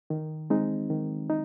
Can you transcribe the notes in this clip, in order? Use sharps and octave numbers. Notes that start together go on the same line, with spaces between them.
D#3
G#3 C4 D#4
D#3
D#4